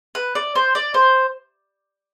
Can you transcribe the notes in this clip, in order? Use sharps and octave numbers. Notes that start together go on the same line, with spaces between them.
B4
D5
C5
D5
C5